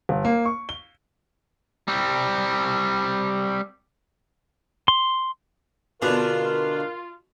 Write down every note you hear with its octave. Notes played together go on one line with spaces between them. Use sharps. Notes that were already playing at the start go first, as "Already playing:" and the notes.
G1
A#3
C#6
G7
G3 C4
C6
B2 D3 B3 D4 F4 G#4 A#4